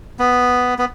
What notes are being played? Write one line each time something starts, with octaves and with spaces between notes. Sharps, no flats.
B3
B3